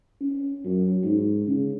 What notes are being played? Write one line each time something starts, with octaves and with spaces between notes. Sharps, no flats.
C#4
F#2
G#2
C#3